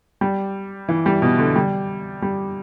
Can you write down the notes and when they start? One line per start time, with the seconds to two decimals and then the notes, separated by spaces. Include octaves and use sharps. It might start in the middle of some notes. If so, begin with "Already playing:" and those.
0.21 G3
0.89 E3
1.06 G3
1.22 B2
1.38 D3
1.56 G3
2.22 G3